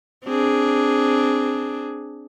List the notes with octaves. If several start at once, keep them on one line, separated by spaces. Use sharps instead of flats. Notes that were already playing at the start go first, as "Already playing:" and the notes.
C4 D4 G#4